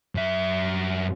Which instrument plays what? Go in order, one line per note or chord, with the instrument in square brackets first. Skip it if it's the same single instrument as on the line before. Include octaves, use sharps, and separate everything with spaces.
[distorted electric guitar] F#2 E5